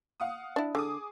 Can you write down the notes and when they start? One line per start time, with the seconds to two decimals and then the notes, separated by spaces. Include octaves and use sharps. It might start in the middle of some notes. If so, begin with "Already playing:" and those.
0.20 F5 F#5 D#6
0.56 D4 E4
0.75 D3 G#4 D6 D#6